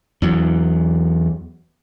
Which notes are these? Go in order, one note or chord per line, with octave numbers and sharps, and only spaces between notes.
E2 F#3